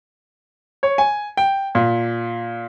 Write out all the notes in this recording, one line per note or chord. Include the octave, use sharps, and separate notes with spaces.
C#5
G#5
G5
A#2